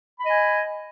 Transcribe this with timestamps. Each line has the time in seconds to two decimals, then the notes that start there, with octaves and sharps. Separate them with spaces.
0.20 B5
0.25 D#5
0.30 G#5